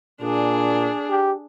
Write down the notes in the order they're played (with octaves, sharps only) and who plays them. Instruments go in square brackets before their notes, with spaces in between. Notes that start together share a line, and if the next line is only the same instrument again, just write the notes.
[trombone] A#2 [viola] D4 G#4
[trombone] G4